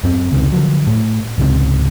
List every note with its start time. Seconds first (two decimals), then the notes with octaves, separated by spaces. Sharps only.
0.04 F#2 C4
0.32 C#2 C3 D#3
0.52 D3 F3 F#3
0.87 A2
1.38 G#1 C#2 G#2 C3